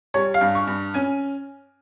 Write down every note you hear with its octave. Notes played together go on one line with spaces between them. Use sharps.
G3 C#5
F5
G2
C#6
G2
C#4 G#5